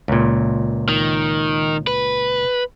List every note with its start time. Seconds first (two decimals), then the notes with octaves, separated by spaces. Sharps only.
0.08 C#2 A#2
0.89 D#3
1.87 B4